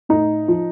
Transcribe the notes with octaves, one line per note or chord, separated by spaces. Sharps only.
A2 D#4
F3